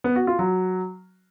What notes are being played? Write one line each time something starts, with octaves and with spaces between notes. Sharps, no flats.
B3
F#4
F4
F#3